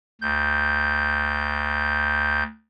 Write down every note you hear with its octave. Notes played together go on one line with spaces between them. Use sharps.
D2 G6